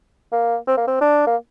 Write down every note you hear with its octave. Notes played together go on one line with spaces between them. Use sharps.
A#3
C4
A#3
C4
D4
A#3